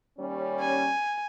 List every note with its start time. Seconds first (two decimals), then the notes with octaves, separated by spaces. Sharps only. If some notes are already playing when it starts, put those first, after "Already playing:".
0.18 D#2 G3 C#4
0.61 G#5